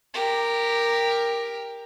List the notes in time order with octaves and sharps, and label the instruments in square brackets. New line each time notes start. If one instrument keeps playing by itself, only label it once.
[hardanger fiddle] G4 A#4